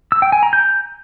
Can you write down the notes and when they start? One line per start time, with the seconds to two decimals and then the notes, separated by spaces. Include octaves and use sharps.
0.12 E6
0.22 G5
0.32 G#5
0.43 A#5
0.53 G6